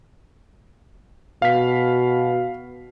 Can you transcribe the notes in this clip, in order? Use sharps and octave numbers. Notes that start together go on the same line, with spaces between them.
B2 F5 B6